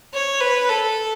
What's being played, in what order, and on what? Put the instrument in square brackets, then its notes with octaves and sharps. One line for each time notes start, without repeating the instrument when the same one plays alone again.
[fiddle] C#5
B4
A4